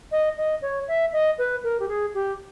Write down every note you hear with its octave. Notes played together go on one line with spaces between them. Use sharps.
D#5
D#5
C#5
E5
D#5
B4
A#4
G4
G#4
G4